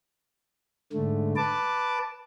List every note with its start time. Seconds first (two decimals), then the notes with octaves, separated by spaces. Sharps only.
0.93 G#2 D3 A3
1.36 B4 A5 D6